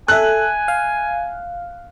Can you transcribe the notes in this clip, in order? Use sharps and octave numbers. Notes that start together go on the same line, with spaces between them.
A4 E5 G#5 F#6
F5